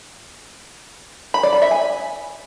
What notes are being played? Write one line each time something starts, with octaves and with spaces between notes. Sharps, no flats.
B5
D5
B5
E5
G#5